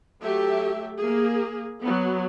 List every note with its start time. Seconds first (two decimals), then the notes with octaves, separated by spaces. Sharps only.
0.21 F#3 A3 G4 E5
0.99 A#3 G#4
1.81 F#3 B3